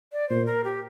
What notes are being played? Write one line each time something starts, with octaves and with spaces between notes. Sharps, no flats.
D5
A#2 C5
A#4
G4